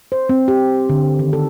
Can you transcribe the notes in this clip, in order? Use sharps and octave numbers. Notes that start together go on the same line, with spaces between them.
C5
C4
G4
D3
D#3
A4